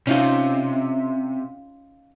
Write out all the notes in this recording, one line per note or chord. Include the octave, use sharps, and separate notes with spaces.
C3 C#4 D#4 F4